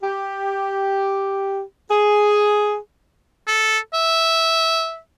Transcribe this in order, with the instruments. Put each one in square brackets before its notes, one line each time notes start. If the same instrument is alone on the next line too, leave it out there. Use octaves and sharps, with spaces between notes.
[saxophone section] G4
G#4
[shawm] A4
E5